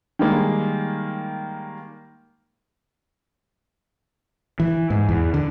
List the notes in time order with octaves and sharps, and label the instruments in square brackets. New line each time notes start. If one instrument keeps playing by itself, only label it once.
[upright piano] D#3 G3 G#3 A#3
[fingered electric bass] E3
G#2
E2
D3